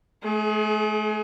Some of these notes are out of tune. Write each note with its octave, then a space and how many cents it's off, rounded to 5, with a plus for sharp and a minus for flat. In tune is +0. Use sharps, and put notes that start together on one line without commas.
A3 -40 G#4 +25